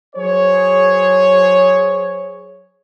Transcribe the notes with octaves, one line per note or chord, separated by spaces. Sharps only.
F#3 G#4 C5 C#5